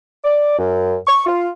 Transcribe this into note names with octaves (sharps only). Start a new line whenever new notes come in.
D5
F#2
C#6
F4